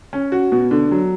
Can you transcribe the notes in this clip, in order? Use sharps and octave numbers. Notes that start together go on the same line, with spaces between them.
C#4
F#4
B2
D3
F#3